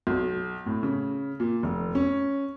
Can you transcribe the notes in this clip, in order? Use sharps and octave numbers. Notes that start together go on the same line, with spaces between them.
B1
A2
C#3
A#2
F1
C#4